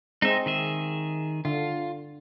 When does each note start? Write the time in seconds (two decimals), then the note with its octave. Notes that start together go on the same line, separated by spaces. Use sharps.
0.22 G#3 C4 D#4 E5
0.46 D#3 G#4 E5
1.45 D3 F4